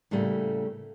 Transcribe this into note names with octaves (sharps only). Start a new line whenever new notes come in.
A2 C#3 G3 A3 A#3